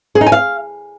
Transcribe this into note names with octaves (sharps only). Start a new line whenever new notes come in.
G#4
D#4
G#5
F5